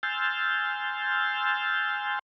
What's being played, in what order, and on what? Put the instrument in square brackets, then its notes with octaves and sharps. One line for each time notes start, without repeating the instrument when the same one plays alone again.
[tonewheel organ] G#5 C6 E6 F6 G6 A6